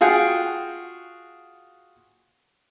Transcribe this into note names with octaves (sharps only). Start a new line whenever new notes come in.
F4 F#4 G#4 F#5 G5